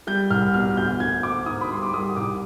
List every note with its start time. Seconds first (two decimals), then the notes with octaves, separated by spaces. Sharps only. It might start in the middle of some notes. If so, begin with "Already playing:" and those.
0.07 G3 G6
0.30 C2 F6
0.54 B2 F6
0.77 D2 G6
1.00 D2 G#6
1.23 D2 D6
1.46 G#2 D#6
1.61 B5
1.70 G3 C6
1.82 D6
1.93 G3 D#6
2.16 C2 D6